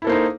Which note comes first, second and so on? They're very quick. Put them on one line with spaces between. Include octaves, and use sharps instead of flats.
E4 A4 A#3 C5 D#4